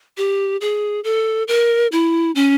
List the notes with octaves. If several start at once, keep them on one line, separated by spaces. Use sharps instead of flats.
G4
G#4
A4
A#4
E4
C#4